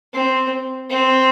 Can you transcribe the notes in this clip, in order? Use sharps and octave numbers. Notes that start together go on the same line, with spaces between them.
C4
C4